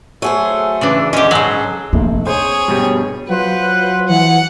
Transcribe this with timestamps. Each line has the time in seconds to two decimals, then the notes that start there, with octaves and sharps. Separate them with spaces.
0.22 F#3 A3 G#4 A4 C5
0.81 C#3 E3 D4
1.13 E2 G#3 C#4 G4
1.31 G#2 C#3 F#3 G#4 A4 C5
1.93 F1 A#1 C4
2.27 G#4 C5 C#5
2.68 G2 B2 G3
3.29 F#3 F4 B4 C5 F#5
4.09 E3 F#5